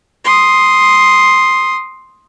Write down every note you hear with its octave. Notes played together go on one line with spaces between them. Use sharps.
C6 D#6